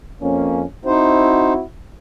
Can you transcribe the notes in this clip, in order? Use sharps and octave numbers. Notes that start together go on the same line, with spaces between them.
F2 A#3 C#4
C4 D#4 E4 F#4 C5